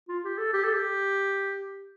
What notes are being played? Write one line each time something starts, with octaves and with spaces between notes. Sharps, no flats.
F4
G4
A4
G4
A4
G4